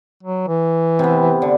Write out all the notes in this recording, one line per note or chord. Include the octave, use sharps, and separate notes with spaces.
F#3
E3
C3 B3
D3